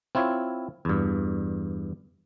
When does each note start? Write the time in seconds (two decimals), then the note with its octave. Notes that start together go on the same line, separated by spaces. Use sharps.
0.15 C4 E4 F4 C#5
0.85 E2 G2